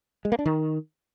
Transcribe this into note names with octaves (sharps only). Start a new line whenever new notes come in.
G#3
A#3
D4
D#3